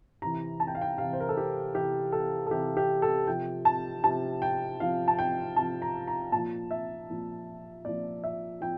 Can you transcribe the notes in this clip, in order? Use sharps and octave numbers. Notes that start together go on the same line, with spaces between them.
C3 E3 A#5
A5
G5
F5
G5
C3 E3 F5
C5
A#4
A4
G4
C3 E3 G4
A4
A4
C3 E3 G4
G4
A4
C3 F3 G5
A5
C3 F3 A5
G5
C3 F3 F5
A5
G5
C3 F3 A5
A#5
A#5
A#2 F3 A5
E5
A#2 F3
A#2 F3 D5
E5
F3 G5